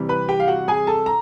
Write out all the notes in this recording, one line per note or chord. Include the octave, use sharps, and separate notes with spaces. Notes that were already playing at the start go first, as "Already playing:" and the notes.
Already playing: C3 E3 G3 C4
B4 B5
G4 G5
F5
F#4 F#5
G#4 G#5
A4 A5
A#5